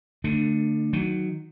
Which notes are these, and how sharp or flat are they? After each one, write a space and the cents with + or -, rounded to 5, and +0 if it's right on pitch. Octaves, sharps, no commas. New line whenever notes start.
D3 +0 A3 +25 D4 +25
D#3 +0 F#3 +0